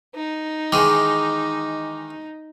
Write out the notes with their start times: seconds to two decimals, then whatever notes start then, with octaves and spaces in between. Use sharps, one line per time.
0.15 D#4
0.72 D#3 E3 G#3 D6